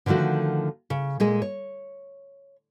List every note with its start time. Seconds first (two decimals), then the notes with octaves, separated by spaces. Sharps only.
0.06 D3 D#3 F3 A3 F#4
0.90 C#3
1.20 A#2 G#3 G#4
1.42 C#5